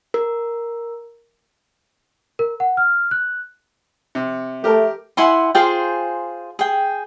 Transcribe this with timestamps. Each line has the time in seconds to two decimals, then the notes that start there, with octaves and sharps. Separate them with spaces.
0.14 A#4
2.39 A#4
2.60 F#5
2.77 F6
3.11 F#6
4.15 C3
4.64 A3 G4 A#4
5.17 E4 F#5 G#5 C6
5.55 F4 G#4 C5 G5
6.59 G#4 G5